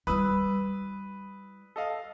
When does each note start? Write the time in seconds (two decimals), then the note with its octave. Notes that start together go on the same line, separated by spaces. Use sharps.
0.07 G3 E4 B4 D#6 E6
1.76 A4 D#5 F5